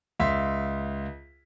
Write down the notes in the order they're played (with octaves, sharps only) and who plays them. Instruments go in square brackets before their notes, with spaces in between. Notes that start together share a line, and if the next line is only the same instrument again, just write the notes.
[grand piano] C#2 E5 F5 C6 B6